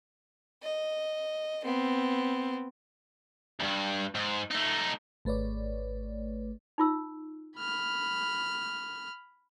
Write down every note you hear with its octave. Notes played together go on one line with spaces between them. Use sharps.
D#5
B3 C4
D2 G2
G#2
A3 D#4
G#1 A3 B4 C#5 D5
D#4 F4 E6
B5 F6